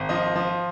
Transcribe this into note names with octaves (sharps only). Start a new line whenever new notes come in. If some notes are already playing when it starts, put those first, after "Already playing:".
Already playing: G#1
F3 D#5
F3